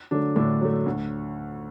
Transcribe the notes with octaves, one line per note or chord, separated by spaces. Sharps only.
D3 F#3 A3 D4
A2 D3 D4
F#3 A3
D2